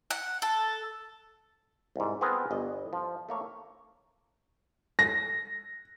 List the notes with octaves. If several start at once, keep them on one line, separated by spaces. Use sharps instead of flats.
F#5
A4
C2 G#2
B3 C4 F4 G#4 A#4 B4
G1 D#5
F3
A3 A#3 C#5
A#6